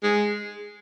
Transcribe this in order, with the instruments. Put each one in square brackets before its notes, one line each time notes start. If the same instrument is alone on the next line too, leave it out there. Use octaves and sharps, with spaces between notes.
[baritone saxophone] G#3